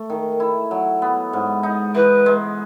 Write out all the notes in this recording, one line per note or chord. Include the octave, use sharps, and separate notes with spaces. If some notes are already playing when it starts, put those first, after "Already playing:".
Already playing: A3
D#3
E4
F#3
B3
G#2
D#4
E3 B4
G#3